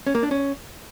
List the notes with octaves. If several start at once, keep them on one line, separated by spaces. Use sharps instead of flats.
C#4
A#3
D4
C#4